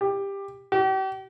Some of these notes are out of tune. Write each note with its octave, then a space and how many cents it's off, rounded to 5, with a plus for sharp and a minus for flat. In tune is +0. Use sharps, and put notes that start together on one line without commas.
G4 +15
G4 -40